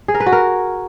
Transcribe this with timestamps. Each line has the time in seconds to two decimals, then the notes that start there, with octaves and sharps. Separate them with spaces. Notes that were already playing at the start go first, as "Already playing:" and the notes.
0.08 G#4
0.14 A#4
0.20 B4
0.26 F#4
0.32 A#4